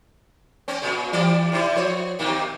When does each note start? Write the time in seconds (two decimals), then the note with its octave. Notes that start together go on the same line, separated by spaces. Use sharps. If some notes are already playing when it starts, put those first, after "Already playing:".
0.68 C4 C#4
0.82 A#2 C#3
1.13 E3 G3 D5
1.52 C3 C4 E4
1.75 F3 C5 C#5
2.19 B2 D#3 A#3